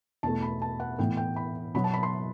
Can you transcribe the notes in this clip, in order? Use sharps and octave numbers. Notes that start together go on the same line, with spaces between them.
E2 B2 A3 A5
B5
A5
F#5
A2 E3 B3 G5
G5
B5
B2 F#3 B3 B5
A5
B5
C6